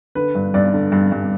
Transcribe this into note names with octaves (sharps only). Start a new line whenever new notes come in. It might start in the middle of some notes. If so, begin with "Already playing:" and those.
D3 B4
G2
G2 D5
D3
G2
G2